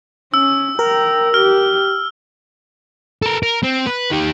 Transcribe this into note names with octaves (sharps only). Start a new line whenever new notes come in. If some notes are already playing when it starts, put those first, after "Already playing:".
C#4 E6
A#4 G5 A#5
G4 F6
A4 A#4
A#4
C4
B4
D#3 G4